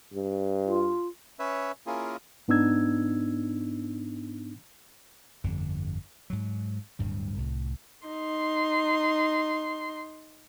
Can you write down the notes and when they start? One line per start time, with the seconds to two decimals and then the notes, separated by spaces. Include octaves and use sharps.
0.14 G2
0.66 F4
1.39 C#4 B4 C#5 E5
1.87 A#3 C#4 E4 F4 G#4 A#4
2.48 G#2 B3 D4 D#4 E6 G#6
5.44 G1 F2 D3
6.30 G#2 F#3
6.99 D1 G2 G3
7.38 C2 A2
8.06 D#4 C6